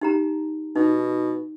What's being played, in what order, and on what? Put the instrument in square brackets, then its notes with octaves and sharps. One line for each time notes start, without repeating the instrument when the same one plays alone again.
[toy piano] D#4 G4 A#5
[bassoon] B2 [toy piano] D#4